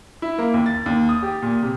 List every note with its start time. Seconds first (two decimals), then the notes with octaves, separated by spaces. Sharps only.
0.22 E4
0.38 A#3
0.54 D#2
0.66 A6
0.86 D#2
1.09 D#6
1.22 G4
1.42 A#2
1.63 C3